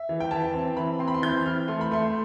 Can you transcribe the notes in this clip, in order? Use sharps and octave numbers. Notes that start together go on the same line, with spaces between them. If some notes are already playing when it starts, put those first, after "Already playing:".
Already playing: E5
E3
G5
E3 A5
C4
E3 B5
C4 C6
B5
C6
E3 G6
E3 F6
A3 C6
B5
A3 C6